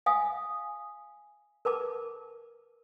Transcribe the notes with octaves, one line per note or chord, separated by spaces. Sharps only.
F5 G#5 D#6
A#4 B4 A5 D6